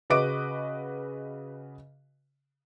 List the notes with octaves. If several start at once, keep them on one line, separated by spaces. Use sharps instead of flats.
C#3 F#4 B4 D#5 D6 D7